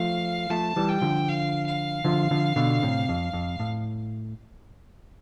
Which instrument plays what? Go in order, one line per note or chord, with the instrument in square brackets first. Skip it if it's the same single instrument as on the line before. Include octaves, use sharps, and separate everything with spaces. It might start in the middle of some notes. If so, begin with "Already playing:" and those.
Already playing: [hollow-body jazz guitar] F3 A3 [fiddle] F5
[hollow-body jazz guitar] F3 A3 [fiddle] A5
[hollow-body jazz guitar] E3 G3
[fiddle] G5
[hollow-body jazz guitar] D3 F3
[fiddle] F5
F5
[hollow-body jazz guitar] D3 F3
D3 F3
B2 D3
A2 C3
F2
F2
A2